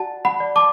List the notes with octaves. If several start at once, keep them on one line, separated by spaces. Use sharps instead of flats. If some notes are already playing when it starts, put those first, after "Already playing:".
Already playing: F#4 D5 F#5 A5
F#5 B5
D5
A5 D6